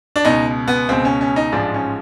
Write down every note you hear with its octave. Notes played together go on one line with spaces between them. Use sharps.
D4
C#2 B2 D#4
B3
C#2 B2 C4
C#4
C#4
D#4
A1 G#2 F3 D4
C#4